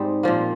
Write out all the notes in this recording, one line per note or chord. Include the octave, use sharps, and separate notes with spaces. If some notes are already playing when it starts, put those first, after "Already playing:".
Already playing: G#2 G3 C4 D#4
A#2 F3 A#3